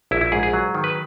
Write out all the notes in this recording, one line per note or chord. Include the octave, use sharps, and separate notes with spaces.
A#1 E4
E4
G#2 G#4
G#4
F#3
D#3
B4